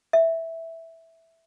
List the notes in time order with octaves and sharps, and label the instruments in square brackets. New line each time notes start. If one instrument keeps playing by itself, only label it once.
[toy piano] E5